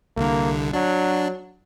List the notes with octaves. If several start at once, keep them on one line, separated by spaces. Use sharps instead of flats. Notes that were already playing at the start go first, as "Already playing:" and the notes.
C2 D3 A#3
F#3 D4